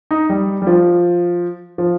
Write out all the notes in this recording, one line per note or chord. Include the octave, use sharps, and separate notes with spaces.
D#4
G3
G3
F3
F3